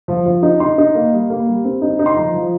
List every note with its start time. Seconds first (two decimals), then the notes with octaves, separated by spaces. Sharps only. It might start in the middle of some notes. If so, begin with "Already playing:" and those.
0.08 F3
0.26 F3
0.43 D#4
0.60 D#4 C6
0.78 D#4
0.95 A#3
1.12 G3
1.30 A#3
1.47 G3
1.64 C4
1.82 D#4
1.99 D#4
2.06 C6
2.17 F3 A#5
2.34 F3